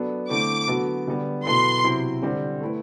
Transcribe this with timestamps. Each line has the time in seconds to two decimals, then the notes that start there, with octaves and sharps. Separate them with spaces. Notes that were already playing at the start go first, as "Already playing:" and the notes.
Already playing: F#3 B3 D4 A4
0.30 D3 A3 C4 E4 D6
0.68 D3 F#3 B3 F#4 A4
1.07 D3 G3 B3
1.45 B2 F#3 B3 E4 A4 C6
1.84 C3 F#3 C4 E4
2.23 D3 G3 C4
2.61 A3 E4 B4